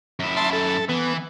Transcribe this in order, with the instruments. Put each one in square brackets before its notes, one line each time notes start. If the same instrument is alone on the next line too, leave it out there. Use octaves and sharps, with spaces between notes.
[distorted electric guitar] F#2 E4
[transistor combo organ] E5 A5 C6
A4
[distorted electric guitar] E3 [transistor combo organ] B3